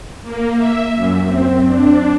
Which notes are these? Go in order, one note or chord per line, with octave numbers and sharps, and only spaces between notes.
A#3
E5
F#2
C4
D4